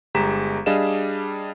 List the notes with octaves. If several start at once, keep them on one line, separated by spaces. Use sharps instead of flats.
G1 G#3 G4 A#5 B6 E7
G3 D4 G#4 D#5 F5 E7